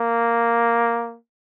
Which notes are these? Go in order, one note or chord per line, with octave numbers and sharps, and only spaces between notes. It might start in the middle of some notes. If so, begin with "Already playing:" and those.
Already playing: A#3